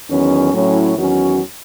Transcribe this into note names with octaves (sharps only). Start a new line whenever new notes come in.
E2 D#3 F#3 C#4
A2 F#3 C#4 E4
E2 D#3 F#3 C#4 F#4